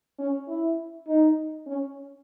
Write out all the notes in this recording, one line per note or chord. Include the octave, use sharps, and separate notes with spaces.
C#4
E4
D#4
C#4